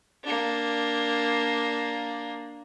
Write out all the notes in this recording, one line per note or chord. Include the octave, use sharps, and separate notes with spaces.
A#3 D4